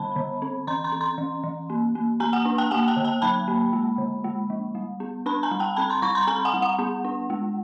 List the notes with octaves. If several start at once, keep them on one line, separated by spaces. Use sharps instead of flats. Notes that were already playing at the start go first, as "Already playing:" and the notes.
Already playing: D3 G3 A5 B5
D3
C4
E3 A#5 C6
A#5 C6
C4
A#5 C6
E3
E3
A#3
A#3
A#3 G#5 A#5
F#5 G#5
D4
G5 A5
A#3 F#5 G#5
G5 A5
D3
G5 A5
F#3 A5 B5
A#3
G#3
D3
G#3
F3
G3
B3
D4 A5 B5
G#5 A#5
G3
G5 A5
C4 A5 B5
A#5 C6
G3 B5 C#6
A#5 C6
C4 G#5 A#5
F#5 G#5
G3
F#5
B3
D4
G#3